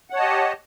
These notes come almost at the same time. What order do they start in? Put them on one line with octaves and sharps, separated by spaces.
F#5 C#5 A5 D#5 G4